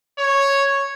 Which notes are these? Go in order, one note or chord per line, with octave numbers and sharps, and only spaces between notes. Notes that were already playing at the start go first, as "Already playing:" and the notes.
C#5